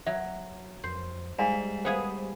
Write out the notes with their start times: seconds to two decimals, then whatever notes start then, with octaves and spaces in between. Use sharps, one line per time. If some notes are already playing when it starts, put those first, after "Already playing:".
0.07 F#3 E5
0.84 F2 C5
1.39 G#2 G3 D5 F5 G#5
1.85 B3 G#4 C5 F5 G#5